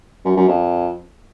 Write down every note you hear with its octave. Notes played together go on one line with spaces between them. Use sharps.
F#2
F#2
F2